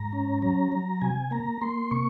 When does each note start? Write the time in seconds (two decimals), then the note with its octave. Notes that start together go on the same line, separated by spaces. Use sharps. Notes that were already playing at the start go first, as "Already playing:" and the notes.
Already playing: G#2 A#5
0.13 C#4
0.42 F#3 A#5
0.72 F#3
1.01 C3 G#5
1.31 A#3 A#5
1.61 A#3 C6
1.91 C3 C#6